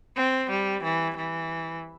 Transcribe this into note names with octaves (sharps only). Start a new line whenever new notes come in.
C4
G3
E3
E3